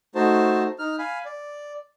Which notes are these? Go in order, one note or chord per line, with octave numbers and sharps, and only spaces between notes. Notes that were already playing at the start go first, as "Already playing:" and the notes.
A3 D#4 F#4 C5 A5
D#4 F6
F5 G#5 B5
D5